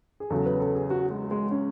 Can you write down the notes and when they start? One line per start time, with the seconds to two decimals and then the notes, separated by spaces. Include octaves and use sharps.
0.20 G#4
0.30 E2 C#3 F#3 A4
0.46 B4
0.60 A4
0.76 G#4
0.90 F#4
1.10 G#3
1.31 G#3
1.51 C#4